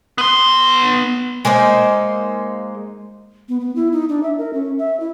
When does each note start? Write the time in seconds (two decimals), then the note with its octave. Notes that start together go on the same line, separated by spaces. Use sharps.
0.18 B3 C6
1.45 G#3 A#3 D#4 C5
3.49 B3
3.60 B3
3.76 E4
3.92 D#4
4.09 D4
4.23 E5
4.38 A#4
4.53 C#4
4.78 E5
5.00 E4